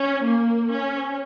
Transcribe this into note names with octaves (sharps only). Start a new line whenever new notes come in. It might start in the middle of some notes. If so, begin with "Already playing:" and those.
Already playing: C#4
A#3
C#4